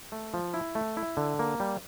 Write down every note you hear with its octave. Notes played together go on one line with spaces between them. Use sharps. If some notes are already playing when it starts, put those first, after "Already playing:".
A3
F3
E4
A3
E4
D3
A#3
G3